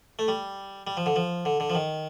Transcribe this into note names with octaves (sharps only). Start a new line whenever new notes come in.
A3
G3
G3
F3
D3
F3
D3
D3
F3
D#3